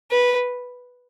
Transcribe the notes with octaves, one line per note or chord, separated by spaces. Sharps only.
B4